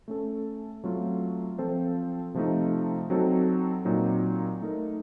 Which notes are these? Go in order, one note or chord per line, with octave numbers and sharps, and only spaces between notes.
A3 C#4 A4
F#3 A3 C4 F4
F3 C4 F4 A4 C5
C3 F3 A3 D#4
F#3 C4 D#4 F#4 A4
A#2 F#3 C4 D#4
A3 D#4 A#4